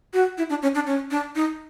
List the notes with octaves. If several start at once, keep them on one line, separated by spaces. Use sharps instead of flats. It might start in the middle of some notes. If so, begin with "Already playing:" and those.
F#4
E4
D4
C#4
D4
C#4
D4
D#4